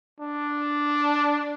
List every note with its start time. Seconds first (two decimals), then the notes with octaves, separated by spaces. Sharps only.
0.20 D4